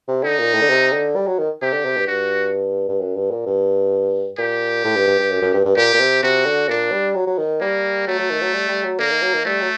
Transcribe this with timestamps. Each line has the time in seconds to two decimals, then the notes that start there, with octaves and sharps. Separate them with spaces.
0.08 C3
0.23 D3 D#4
0.39 A#2
0.54 A2
0.62 D3
0.70 C3
0.93 D3
1.16 G3
1.27 F#3
1.39 D#3
1.62 C3 G4
1.73 D3
1.85 C3
1.97 G2
2.08 G2 F#4
2.89 G2
3.00 F#2
3.15 G2
3.31 A#2
3.46 G2
4.38 A#2 G4
4.84 A2
4.96 G2
5.07 G2
5.19 G2
5.31 F#2
5.42 F#2
5.54 G2
5.65 G2
5.76 A#2 G4
5.94 A#2
6.00 C3
6.23 C3 F#4
6.46 D3
6.69 A#2 D4
6.92 G3
7.15 F#3
7.27 F#3
7.38 D#3
7.61 G3 A#3
8.07 F#3 A3
8.19 F#3
8.30 D#3
8.42 F#3
8.53 G3
8.69 G3
8.84 F#3
8.99 D3 A#3
9.11 D#3
9.23 F#3
9.34 D#3
9.45 G3 A3
9.61 F#3